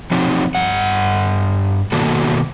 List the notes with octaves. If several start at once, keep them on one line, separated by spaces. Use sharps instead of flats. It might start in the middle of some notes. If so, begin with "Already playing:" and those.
F3 F#3 C4 D#4
G2 F#5
B2 D#3 A#3 F#4 A4